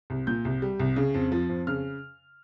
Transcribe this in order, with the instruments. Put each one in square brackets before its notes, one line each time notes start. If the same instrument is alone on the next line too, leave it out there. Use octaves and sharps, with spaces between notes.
[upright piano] C2
A#2 G6
C2
G3
C2
C#3
F2
F3
F2
C#3 F6